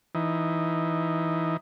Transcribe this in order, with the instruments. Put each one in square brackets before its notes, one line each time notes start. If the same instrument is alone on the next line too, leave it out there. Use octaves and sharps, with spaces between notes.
[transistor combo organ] E3 D#4